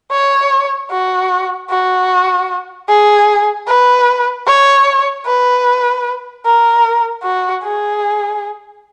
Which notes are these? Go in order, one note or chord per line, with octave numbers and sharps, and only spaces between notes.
C#5
F#4
F#4
G#4
B4
C#5
B4
A#4
F#4
G#4